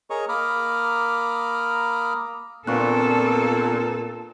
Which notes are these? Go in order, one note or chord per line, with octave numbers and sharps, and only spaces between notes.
G#4 A#4 C#5 D#5 C#6
A#3 A#5 B5 D6 D#6 F6
A#2 B3 C4 D4 F4 A4 C#6 F#6